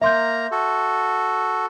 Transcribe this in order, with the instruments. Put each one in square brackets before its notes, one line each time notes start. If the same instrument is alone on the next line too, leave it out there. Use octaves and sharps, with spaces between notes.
[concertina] A#3 A#5 [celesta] E5 C6 G6
[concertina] F#4 A4